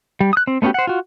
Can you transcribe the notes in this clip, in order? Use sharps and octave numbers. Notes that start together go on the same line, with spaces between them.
G3
D#6 F#6
C4
A3 B3 C#4 F#4 G4
C5 F#5
F4 F#4